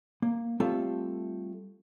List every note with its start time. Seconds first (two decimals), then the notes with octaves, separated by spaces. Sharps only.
0.22 A#3
0.60 G3 A3 C4 F4 A4